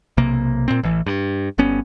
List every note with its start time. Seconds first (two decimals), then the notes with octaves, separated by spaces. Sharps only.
0.17 B1 C3 A#3
0.68 A#2 C4
0.83 A1 E3
1.07 G2
1.58 G1 G2 B3 C#4